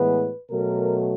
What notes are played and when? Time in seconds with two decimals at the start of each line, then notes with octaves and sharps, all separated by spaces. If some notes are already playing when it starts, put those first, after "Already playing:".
Already playing: A2 E3 G#3 B3 B4
0.51 B2 F#3 A3 A#4